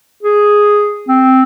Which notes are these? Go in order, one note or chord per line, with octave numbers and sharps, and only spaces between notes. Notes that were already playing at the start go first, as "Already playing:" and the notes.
G#4
C4